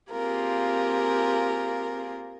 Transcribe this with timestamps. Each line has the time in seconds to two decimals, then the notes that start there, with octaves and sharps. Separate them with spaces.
0.11 A#3 C4 F4 G4 G#4 A#4